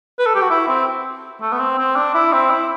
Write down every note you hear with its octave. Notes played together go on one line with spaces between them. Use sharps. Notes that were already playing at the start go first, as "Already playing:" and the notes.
B4
A4
G4
F#4
E4
C4
A3
B3
C4
C4
D4
E4
C4
E4